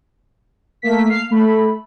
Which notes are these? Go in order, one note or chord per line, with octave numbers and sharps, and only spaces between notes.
A3 A#3 B6
F5 C7
A3 B5